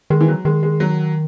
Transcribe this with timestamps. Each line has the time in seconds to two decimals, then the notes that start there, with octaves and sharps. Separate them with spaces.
0.10 D#3 G#3
0.20 E3
0.28 F#3
0.45 D#3 G#3
0.63 G#3
0.80 F#3